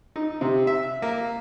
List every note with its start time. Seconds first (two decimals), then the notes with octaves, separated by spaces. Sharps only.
0.16 D#4
0.41 C3
0.67 E5
1.02 A#3